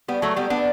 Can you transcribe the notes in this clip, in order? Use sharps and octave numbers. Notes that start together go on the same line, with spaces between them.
G3 B3
F#3 A3
G3 B3
B3 D4